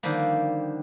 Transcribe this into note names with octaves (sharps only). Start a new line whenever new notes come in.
D3 D#3 F3 G3 A#3